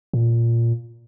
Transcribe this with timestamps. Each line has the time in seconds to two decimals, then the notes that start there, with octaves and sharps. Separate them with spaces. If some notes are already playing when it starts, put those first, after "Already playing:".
0.13 A#2